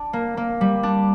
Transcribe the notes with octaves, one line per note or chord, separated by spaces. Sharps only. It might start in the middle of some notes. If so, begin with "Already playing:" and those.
Already playing: D4
A#3
A#3
G3
D4